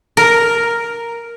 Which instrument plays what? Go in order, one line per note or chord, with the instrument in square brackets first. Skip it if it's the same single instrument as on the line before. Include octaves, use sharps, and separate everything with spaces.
[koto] A#4